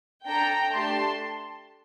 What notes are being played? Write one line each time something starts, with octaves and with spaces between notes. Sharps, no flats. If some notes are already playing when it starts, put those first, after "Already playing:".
D4 A4 G5 A#5
A3 D4 G4 A5 C6